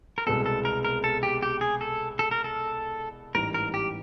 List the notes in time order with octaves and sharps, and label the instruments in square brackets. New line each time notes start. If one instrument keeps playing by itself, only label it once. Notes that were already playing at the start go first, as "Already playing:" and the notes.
[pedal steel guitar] A#4
[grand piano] C2 B2 G#3 B3 [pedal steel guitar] A4
[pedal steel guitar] A4
A#4
A#4
A4
G4
G4
G#4
A4
A4
A#4
A4
[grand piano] A1 G#2 E3 G3 [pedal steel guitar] A#4
[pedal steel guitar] A#4
G4